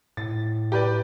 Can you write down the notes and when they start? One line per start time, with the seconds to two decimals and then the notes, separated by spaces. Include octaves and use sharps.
0.17 A2 A6
0.72 G4 B4 D5